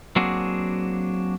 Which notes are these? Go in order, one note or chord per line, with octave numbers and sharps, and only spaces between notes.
F#3 A#3 C4 D4 F#4 G#4